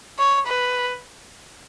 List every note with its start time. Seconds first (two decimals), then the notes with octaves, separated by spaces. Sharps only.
0.19 C#5
0.47 B4